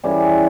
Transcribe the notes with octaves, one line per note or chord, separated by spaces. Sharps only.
E3 G3 C#4 G#4